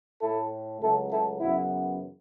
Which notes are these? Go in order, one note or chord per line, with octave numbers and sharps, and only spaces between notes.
A2 E4 A4
A3
C#2 C#3 F#3 A3 E4 A4
E4 A4
F#2 C#3 E3 B3 E4